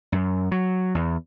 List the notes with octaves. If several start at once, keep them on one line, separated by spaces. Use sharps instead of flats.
F#2
F#3
E2